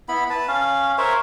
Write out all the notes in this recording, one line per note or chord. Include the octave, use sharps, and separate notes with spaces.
B3 E4 B5
B4 A5
C#4 F5
A#4 C5 C#5 E5